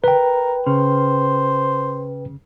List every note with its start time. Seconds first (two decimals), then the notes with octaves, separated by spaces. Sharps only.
0.04 A#4 B4 G5
0.67 C#3 C5